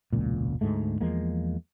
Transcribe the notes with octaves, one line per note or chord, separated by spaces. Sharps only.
E1 C#2 A#2
D2 G#2 G#3 A3
E2 F3 G#3 A#3